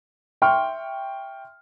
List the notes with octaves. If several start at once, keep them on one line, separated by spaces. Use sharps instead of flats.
E5 G5 C6 C#6 F6